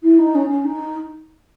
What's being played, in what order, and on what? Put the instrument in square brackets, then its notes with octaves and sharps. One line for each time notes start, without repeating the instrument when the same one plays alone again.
[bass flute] E4
D#4
C#4
C#4
D#4